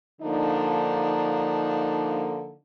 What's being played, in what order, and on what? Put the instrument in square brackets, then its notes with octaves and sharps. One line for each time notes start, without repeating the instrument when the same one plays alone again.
[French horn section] D3 F3 A#3 D4 D#4